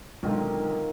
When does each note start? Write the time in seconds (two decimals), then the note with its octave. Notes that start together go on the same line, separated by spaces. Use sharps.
0.23 B1 D3 D#3 G#3 C4 F4